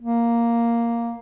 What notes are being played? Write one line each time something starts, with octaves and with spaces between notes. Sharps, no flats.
A#3